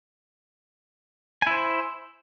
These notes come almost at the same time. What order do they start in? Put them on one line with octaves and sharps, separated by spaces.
G#5 E4 C5